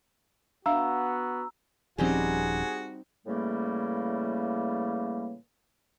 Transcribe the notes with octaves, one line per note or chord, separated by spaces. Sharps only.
B3 D4 F#4 E5 F5 A#5 E6
D#1 F3 G3 C4 C#4 D#4 F#4 G#4
A2 C#3 E3 G3 A3 A#3